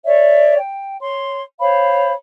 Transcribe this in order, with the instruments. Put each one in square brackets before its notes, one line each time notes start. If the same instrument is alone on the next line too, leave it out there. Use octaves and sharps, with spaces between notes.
[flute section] C#5 D5 E5
G5
C#5 C6
C5 C#5 F5 B5